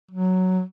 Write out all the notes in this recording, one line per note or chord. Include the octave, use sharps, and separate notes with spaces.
F#3